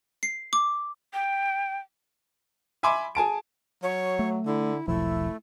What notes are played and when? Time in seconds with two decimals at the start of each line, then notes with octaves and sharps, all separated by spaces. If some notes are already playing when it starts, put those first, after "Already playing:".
0.23 C7
0.53 D6
1.14 G5
2.83 E5 G#5 B5 C6 D6
3.15 G#4 G#5 A5 D7
3.83 F#3 C#5
4.19 A3
4.46 D3 E4
4.88 E1 B1 F3 A3 E4